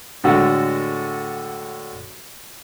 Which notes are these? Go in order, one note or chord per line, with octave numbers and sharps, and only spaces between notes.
A2 D3 G#3 F#4 A4